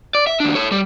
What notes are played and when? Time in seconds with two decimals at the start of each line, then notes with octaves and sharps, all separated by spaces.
0.15 D5
0.27 E5
0.40 D#2 D4
0.55 A4 C#5
0.72 G3